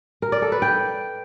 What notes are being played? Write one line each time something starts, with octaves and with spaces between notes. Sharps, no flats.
A#4
D5
A4
B4
G5